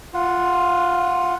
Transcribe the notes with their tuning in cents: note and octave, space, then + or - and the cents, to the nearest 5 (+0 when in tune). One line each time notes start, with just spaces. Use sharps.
F4 +0 F#5 -10